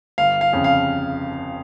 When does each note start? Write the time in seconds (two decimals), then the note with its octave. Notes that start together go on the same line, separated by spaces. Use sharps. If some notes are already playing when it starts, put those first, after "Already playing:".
0.18 G1 F5
0.41 F5
0.53 F2 C#3
0.64 F5